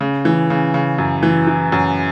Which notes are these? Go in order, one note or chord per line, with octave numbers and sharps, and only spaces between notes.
C#3
E3
C#3
C#3
F#2
E3
E3
F#2